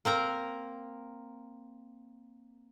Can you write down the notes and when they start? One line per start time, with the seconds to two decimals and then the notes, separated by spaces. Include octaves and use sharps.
0.05 A#3 C4 A#4 A#5